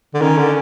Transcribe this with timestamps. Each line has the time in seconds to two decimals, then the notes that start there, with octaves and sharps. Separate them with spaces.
0.14 D3
0.21 D#3 C#4
0.38 D3